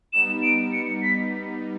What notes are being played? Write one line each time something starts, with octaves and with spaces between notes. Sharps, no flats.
G3 B3 D#4 E7
D7
C#7
B6